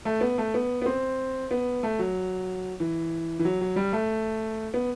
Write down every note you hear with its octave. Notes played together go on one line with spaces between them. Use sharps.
A3
B3
A3
B3
B3
C4
B3
A3
F#3
E3
E3
F#3
F#3
G3
A3
B3